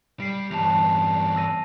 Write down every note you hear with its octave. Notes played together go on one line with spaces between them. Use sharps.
G3 C7 D7
E2 G2 A5 F7
E6 A#6 D#7